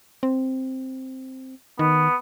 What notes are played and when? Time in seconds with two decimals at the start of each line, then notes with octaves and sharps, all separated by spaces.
0.23 C4
1.79 D#3 B3